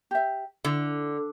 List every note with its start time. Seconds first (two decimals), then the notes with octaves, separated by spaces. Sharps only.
0.11 G4 E5
0.64 D3 E4